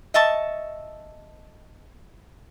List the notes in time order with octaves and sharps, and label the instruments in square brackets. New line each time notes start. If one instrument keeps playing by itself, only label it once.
[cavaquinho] D#5 E5 A5 C#6